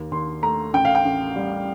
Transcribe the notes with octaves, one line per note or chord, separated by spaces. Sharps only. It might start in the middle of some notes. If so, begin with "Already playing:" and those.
Already playing: D#2
D#2 C6
A3 A#5
A1 G5
F5
G5
A1
G3